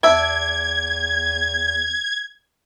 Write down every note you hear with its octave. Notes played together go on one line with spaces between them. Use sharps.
E2 D4 E5 G#6